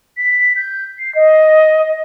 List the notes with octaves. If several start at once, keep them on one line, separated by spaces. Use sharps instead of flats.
B6
G6
C7
D#5